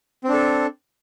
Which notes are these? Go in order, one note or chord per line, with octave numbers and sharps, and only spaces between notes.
C4 D4 A4